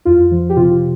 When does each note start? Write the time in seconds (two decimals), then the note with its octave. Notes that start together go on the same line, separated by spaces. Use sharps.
0.05 F2 F4
0.31 F3
0.50 G4
0.57 C3 F4